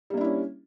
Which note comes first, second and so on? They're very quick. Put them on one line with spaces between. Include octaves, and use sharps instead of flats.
G3 A#3 D4 E4 C#4